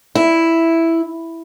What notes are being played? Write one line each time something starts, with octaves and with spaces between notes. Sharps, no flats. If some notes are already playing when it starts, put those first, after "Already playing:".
E4